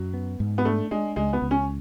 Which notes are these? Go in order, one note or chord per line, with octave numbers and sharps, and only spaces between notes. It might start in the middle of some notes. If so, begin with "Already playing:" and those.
Already playing: F#2 F#3
B3
G#2
B3
A3 D4
G#3 D4
C#2 G#3
B3
C#2
C#4